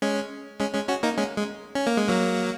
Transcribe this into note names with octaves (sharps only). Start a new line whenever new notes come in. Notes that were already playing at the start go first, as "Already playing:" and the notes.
G#3 C#4
G#3 C#4
G#3 C#4
C#4 F#4
A#3 D#4
G#3 C#4
G#3
C#4
A#3
G#3
F#3 A#3